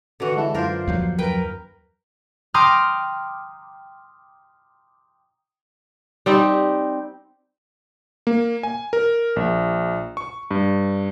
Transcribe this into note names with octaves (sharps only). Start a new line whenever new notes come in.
D3 E3 F#4
G#3 E4 A5
F#2 D4 F4 A#4 C5
D#2 F3 F#3
F#2 A#4 B4 G5
G5 A#5 C6 D6 D#6 F6
G3 C4 D#4
A#3
G#5
A#4
A#1
C#6
G2